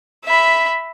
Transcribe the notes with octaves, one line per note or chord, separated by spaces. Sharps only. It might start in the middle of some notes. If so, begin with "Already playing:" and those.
E5 B5